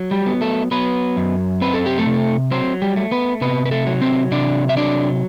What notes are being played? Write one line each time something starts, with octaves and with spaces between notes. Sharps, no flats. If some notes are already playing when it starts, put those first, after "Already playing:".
Already playing: F#3
G3 G4
B3
A3 A4
F#3 B3 B4
F#2
C4 B4
A4
G4
A3 A4
C3
F#3 C4 C5
G3 G4
A3
B3 B4
C3 B3 B4
B4
A3 A4
F#3
C4 C5
C3 D4 D5
E5
F#3 D4 D5